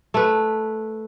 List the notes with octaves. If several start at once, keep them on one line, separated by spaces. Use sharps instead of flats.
A3 B4